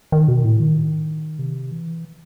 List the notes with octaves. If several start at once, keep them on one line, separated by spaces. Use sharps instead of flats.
D#3
B2
A2
D#3
C3
E3